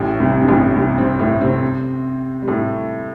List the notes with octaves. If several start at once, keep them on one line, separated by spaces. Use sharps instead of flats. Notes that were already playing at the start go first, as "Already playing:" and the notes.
Already playing: A1 A2
C2 C3
G2
A1 A2
C2 C3
C3 C4
A2 A3
C3 C4
G3
A2 A3